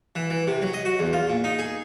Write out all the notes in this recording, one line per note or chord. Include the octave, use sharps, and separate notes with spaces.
E3
E3
C3
F#3
D#5
F#4
E2
F4
A#2
D#4
G#4